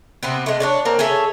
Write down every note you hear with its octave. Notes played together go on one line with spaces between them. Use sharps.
C3 B3 C4
G#3 A3
D4 C#5 D5
A#3 C4 A#5
G#4 A4 C#5 E5